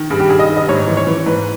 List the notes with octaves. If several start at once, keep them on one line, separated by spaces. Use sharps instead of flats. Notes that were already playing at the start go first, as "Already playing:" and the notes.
Already playing: D#3
G2 G#4
G4
G2 G#4
D#5
D#3
D#5
G#2 C#5
E3
C#5
E3
G#2 B4